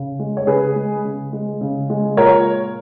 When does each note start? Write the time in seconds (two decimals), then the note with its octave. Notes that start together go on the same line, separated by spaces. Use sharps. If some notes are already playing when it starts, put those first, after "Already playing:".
Already playing: C#3
0.19 G#3
0.37 C#5
0.47 C#3 G#4 B4
0.76 G#3
1.05 C#3
1.33 G#3
1.61 C#3
1.90 G#3
2.17 A#2 A#4 C#5